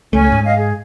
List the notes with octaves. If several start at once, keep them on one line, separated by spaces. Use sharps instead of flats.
C#2 A3 C#4 G#5
G#2
D#5 F5
G#4